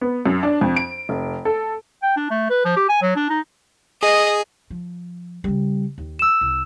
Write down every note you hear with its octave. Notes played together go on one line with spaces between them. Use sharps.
B3
F#2
D4
F2
D7
F1
A4
G5
D4
A3
B4
F3
G4
G#5
F#3
D4
D#4
G#4 D#5
F3
C#3 G3
D#2
E6 E7
C2